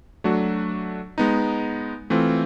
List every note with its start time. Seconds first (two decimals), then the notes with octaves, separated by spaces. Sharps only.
0.24 F#3 A3 D4 F#4
1.18 G#3 B3 D#4
2.10 E3 A3 C4 F4